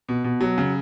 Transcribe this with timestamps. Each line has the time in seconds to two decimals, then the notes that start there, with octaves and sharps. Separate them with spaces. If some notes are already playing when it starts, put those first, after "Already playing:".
0.09 B2
0.24 B2
0.41 F#3
0.58 C#3